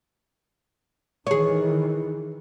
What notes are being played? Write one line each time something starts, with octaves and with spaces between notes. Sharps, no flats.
D#3 E3 G#4 C#5